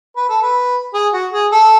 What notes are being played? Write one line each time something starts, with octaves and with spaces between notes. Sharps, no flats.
B4
A4
B4
G#4
F#4
G#4
A4